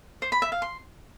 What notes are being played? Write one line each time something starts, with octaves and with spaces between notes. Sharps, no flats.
C5
B5
E5
F5
C6